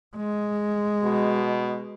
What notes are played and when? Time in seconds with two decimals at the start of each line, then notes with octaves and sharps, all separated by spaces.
0.16 G#3
1.03 B2